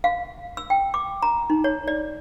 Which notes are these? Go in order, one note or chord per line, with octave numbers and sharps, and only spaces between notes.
F5
E6
G5
D6
A#5
D#4
C#5
D5